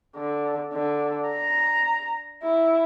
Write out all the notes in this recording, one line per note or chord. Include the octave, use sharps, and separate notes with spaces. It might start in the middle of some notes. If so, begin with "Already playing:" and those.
D3
D3
A#5
E4